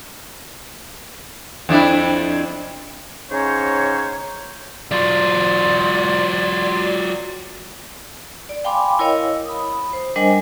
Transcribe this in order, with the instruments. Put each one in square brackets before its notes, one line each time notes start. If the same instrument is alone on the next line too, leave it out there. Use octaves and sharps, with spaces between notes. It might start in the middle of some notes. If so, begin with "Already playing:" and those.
[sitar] F2 D4 E4
[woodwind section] G#2 C#3 C#4 D#4 C5 C#5
[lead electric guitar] F#3 F4 [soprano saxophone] D5 [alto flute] C6
[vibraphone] D5
F5 G5 G#5 B5 C6 D6
E4 A#4 C#5 D#5 F5
B5 D#6
C5
G3 D4 A#4 C5 D#5 G#5